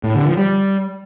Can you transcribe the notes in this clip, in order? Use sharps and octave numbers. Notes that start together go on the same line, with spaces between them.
A2
D3
F3
G3